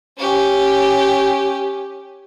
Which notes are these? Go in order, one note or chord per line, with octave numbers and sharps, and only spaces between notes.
C#4 G4